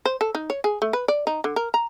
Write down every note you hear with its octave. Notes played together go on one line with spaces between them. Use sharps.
C5
A4
D#4
C#5
G#4
A3
B4
D5
D#4
D3
A#4
A#5